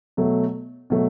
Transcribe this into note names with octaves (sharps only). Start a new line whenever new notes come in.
B2 F#3 A3
B2 F#3 A3